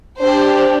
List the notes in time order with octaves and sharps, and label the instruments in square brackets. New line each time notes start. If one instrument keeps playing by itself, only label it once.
[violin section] D4 G4 C5